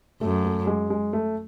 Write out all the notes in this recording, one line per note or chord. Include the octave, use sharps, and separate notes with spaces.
F#2 A3
A3
G#3
G#3
A3